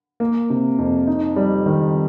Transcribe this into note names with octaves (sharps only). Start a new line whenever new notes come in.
A#3
C3
F2
D#4
G3
D#3